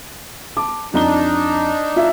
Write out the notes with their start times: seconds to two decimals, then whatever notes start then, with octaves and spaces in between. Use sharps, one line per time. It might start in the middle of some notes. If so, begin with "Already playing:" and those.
0.57 A5 D6
0.94 F2 D4 D#4 A#5 G7
1.96 F4 E5